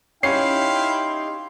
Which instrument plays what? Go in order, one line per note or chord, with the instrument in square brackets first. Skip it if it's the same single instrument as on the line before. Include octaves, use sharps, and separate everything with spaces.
[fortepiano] C#4 [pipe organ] D#4 G4 C6 [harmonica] E4 F5 G5 [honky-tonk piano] C7